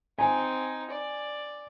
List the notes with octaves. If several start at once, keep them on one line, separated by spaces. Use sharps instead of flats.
C4 D#4 G#5
D5